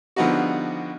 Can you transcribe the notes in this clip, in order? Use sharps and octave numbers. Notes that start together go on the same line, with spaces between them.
D3 F3 G3 B3 D#4 F#4